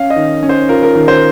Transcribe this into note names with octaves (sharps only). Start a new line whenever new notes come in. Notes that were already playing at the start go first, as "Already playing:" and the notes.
Already playing: C#4 F5
D#5
D#3
C#4
C5
F4 A#4
A#4
D#3
C5